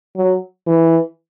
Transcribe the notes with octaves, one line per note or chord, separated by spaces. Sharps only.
F#3
E3